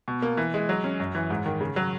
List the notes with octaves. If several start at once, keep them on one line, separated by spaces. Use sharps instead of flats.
B2
A#3
E3
G#3
F#3
C#4
F#2
E3
G#2
D#3
C#3
F#3